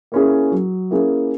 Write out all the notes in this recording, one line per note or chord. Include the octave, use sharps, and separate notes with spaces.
A#3 C#4 E4 G#4
F#3
A#3 C#4 E4 G#4